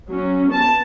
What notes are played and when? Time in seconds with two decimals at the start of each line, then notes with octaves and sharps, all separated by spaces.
0.10 F#3 C#4
0.51 B3 A5